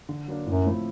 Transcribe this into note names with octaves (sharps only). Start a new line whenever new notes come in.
D3
F#3 A#3 D4
F#2 A2
F3 A3 C4 E4